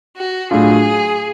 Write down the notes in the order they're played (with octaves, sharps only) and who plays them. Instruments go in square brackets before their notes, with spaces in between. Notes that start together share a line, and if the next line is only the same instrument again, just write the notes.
[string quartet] F#4
[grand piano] A2 F#3 A3 D4 F4 [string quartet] G#4